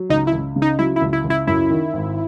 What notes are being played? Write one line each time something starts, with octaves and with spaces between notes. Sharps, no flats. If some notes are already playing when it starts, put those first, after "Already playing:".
Already playing: F#3
C#2 D#4
E4
C#2
C#3
D#4
F#3 E4
E4
C#2
E4
C#2
E4
F#2 E4
D#3
G#1